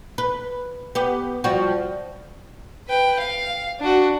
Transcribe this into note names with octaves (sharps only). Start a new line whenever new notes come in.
B4
B3 G4
F3 G3 F#4
B4 G5
F5
D4 F#4